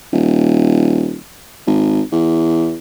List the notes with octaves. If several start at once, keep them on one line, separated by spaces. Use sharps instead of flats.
D#1
G#1
E2